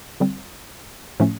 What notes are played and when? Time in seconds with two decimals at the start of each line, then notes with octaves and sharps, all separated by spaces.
0.20 D3 G3 C4
1.20 A2 F3 A3 C#4